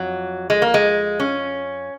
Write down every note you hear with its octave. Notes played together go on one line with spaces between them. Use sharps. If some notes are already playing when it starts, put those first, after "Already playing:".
Already playing: F2 F#3
G#3
A#3
G#3
C#4